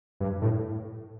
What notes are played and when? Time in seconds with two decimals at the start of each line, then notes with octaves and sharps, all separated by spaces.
0.20 G2
0.42 A2